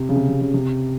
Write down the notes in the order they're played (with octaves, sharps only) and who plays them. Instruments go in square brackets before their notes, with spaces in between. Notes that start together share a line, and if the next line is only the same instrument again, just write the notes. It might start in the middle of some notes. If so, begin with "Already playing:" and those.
Already playing: [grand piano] C3
C#3
C3
C3
C#3
C3